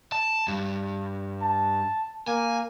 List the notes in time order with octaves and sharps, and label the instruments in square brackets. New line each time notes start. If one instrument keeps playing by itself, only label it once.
[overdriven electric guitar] A5
G2
[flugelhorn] A5
[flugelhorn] A#3 [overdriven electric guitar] G#5